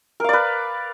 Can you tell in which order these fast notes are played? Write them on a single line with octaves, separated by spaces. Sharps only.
A#4 F5 D5 B4